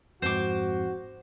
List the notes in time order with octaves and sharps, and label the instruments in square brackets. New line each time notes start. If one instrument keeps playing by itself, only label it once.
[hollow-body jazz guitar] F2 G#2 [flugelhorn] F#4 [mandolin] C5 D6